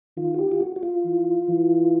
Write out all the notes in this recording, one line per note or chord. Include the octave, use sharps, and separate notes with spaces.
D#3 F4
F#4
G4
F4
F#4
F#4
F4
E3
E3